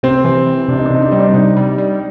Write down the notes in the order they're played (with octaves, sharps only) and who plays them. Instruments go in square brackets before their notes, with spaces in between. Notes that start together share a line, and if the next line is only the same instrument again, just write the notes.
[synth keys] C3 [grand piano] C4
[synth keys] E3
E3
[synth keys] C3 [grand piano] D4
[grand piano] D#4
D4
[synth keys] C3 [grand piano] D#4
[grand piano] D4
[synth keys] G3 [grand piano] D#4
[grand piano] D4
[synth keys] C3 [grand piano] D#4
[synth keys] G3
G3